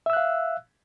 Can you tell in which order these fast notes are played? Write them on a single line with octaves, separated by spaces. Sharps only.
E5 E6 F#6 F5